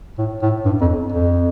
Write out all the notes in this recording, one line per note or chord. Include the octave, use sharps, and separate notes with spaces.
A2
A2
G2
F2
F2